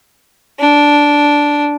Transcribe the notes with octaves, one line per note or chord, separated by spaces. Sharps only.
D4